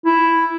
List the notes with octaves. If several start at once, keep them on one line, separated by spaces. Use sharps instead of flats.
E4